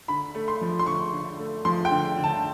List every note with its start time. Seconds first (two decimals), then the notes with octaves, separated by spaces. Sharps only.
0.08 D3 B5
0.35 A3
0.48 C6
0.61 F3
0.79 C6
0.86 D3 C#6
1.12 D3
1.39 A3
1.65 F3 C6
1.85 G5
1.91 D3
2.17 D3
2.24 A5